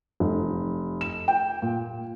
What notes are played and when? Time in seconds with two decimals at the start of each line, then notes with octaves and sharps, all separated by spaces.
0.20 F1
1.01 E7
1.28 G5
1.62 A#2